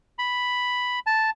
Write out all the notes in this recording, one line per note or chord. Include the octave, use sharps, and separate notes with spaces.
B5
A5